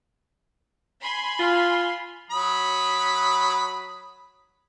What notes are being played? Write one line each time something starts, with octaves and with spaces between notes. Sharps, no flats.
G#5 B5 C6
F4
F#3 B5 D#6